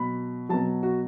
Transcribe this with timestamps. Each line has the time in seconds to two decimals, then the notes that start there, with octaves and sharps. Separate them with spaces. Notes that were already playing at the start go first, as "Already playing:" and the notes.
Already playing: B2 F#3 B5
0.49 B2 F#3 A5
0.83 F#4